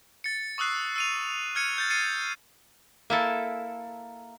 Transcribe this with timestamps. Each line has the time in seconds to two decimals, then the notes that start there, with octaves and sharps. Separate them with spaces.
0.24 A6 C#7
0.58 C#6 D#6 E6 F#6 C7
0.96 E6 D#7 F7
1.55 F6 G#6 C#7 D#7
1.78 G6 A6
1.90 A6 C7 C#7 D#7
3.10 A#3 E4 A4